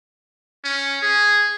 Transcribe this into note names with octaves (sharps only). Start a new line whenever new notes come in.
C#4
G#4